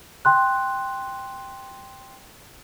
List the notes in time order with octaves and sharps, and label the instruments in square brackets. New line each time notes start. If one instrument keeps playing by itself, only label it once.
[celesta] G5 C6 F#6